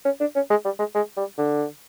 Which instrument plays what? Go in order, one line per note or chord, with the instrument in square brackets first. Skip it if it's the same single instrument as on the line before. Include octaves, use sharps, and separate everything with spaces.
[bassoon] C#4
D4
C#4
G#3
G3
G#3
G#3
G3
D3